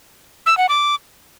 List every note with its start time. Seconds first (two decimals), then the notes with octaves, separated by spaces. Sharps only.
0.46 E6
0.58 F#5
0.69 D6